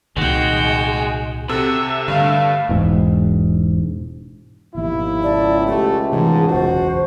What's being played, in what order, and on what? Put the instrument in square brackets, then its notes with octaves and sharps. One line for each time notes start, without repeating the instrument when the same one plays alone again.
[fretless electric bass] C2 A#2 D#3 [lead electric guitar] G#3 [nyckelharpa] F#4 G5
[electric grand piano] C3 A4 [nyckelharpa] F#4 [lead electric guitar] E5
[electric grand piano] G2 [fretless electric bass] D3 [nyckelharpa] A3 F5
[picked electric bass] E1 G#2
[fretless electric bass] G#1 B2 F3 [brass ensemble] D#2 [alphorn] E4
[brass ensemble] C#2 A5 [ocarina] D5
[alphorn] A3 [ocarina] G4
[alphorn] G#2 [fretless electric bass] C3 E3 A3 [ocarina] G#4
[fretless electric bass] F#1 B1 E2 [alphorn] F#4 [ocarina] C5